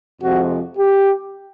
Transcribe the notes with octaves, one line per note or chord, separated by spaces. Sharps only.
F2 C3 F3 G#3 C4 F#4
G4